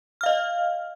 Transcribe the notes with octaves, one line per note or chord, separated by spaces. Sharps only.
D#5 F5 F6